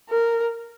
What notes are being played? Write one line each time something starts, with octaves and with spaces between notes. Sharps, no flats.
A#4